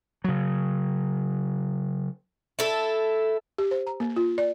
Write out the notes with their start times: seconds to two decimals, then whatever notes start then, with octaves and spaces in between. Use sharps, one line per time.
0.24 C#3 F#3
2.59 E4 A4
3.58 G4
3.71 C5
3.87 A#5
4.00 A#3
4.16 F4
4.38 D5